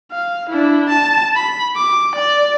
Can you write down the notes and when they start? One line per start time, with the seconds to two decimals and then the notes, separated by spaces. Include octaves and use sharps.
0.12 F5
0.50 D4 E4
0.89 A5
1.36 B5
1.76 D6
2.15 D5